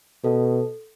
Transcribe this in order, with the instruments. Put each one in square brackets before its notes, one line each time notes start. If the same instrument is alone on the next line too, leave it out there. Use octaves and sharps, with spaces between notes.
[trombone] B2 [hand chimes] A4